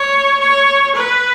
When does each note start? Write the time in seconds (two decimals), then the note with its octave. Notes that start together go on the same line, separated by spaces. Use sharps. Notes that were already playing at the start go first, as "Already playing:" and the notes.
Already playing: C#5
0.39 C#5
0.95 B4